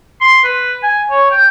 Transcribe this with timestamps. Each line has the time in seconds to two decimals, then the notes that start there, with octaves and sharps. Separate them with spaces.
0.21 C6
0.44 B4
0.83 G#5
1.11 C#5
1.31 G5